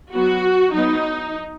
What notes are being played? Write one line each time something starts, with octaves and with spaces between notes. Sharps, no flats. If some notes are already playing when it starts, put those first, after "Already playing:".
F#3 B3 F#4
F#3 B3 D#4